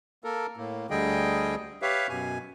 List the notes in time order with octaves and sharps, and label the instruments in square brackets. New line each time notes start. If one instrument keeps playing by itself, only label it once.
[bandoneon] A#3 A4 A#4
A2 A#3
D2 D3 G3 G#4 D#5 G5
G4 B4 C#5 E5 F5
F#2 B2 G#5